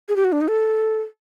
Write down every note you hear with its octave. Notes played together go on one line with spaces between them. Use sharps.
G#4
G4
F#4
D4
D#4
A4